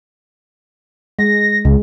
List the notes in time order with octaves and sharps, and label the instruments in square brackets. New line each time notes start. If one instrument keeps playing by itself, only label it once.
[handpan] G#3 [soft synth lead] A#6
[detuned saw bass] C#2 [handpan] G#3